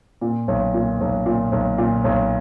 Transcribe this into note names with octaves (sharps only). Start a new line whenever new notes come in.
A#2
B1
A#2
B1
A#2
B1
A#2
B1